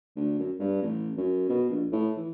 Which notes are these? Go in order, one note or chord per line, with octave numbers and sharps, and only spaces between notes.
D2
F#2
G2
A1
F#2
B2
A#1
A2
E3